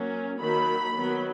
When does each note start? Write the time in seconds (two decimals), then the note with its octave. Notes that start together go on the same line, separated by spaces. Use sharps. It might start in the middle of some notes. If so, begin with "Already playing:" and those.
Already playing: F#3 A#3 C#4
0.40 D#3 F#3 A#3 B5
0.93 D#3 F#3 B3